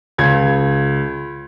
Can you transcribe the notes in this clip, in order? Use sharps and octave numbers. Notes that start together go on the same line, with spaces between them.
C#2 G#6